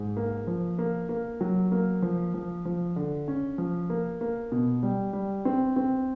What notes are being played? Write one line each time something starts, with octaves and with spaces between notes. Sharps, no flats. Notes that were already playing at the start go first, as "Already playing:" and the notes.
Already playing: G#2
A#3
F3
A#3
A#3
F#3
A#3
F3
F3
F3
D3
C#4
F3
A#3
A#3
B2
G3
G3
C4
C4